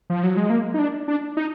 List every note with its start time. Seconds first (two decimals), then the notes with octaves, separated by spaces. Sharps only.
0.10 F3
0.23 F#3
0.37 G#3
0.50 A#3
0.74 D#4
0.79 D4
1.08 D4
1.37 D#4